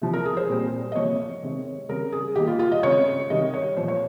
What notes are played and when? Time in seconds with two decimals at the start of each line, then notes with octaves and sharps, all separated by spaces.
0.02 C3 F3 C4
0.13 A#4
0.25 G#4
0.37 C5
0.49 A#2 G3 C4
0.92 D#5
0.96 C3 F3 A#3 C#5
1.42 C3 D#3 G#3 C4
1.89 C#3 G3 C4 A#4
2.12 G#4
2.35 D#3 G3 A#3 G4
2.47 F4
2.59 F4
2.72 D#5
2.83 C#3 G#3 C4 C#5
3.30 C3 D#3 G3 D#5
3.54 C#5
3.77 A#2 F3 A#3 C5
3.88 C#5